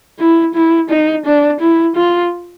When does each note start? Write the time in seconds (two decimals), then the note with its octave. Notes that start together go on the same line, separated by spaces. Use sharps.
0.19 E4
0.54 E4
0.90 D#4
1.25 D4
1.60 E4
1.96 F4